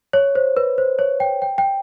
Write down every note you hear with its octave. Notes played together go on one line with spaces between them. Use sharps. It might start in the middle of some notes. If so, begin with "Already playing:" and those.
C#5
C5
B4
C5
C#5
G5
G5
G5